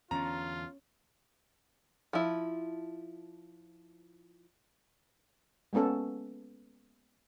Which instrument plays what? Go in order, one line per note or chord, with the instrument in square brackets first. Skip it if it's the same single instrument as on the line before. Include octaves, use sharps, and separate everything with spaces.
[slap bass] E2 D3 [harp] C#4 A6 [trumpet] F4 [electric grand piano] A#5
[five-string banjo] F3 E4
[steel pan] G#3 A#3 B3 C#4 A4